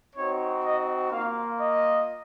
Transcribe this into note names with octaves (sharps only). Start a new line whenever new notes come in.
C4 D#4 F#4 C#5
D#5
A#3 F4 F5
D#5